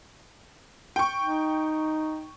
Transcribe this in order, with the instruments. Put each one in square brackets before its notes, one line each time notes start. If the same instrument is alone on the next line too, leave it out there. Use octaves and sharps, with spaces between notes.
[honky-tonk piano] G5 C#6
[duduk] D#4